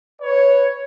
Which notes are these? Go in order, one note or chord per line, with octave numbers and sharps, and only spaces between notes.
B4 C#5